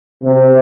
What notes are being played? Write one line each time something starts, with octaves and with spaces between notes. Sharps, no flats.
C3